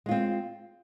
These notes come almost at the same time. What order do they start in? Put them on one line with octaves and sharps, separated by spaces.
G#3 F4 C4